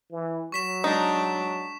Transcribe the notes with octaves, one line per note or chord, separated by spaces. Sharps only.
E3
F#3 C#6 B6 E7
G#3 D4 D#4